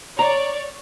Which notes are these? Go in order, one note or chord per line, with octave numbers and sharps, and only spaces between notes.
C#5 D5 A#5